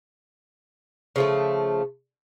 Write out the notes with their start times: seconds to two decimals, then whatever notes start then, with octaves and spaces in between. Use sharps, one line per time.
1.16 C#3 F3 A3